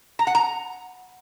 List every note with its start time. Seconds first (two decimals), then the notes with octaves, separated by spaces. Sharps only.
0.19 A#5
0.27 F#5
0.35 A#5